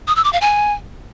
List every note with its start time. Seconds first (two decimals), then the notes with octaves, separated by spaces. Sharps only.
0.08 D#6
0.16 E6
0.24 D6
0.33 F5
0.41 G#5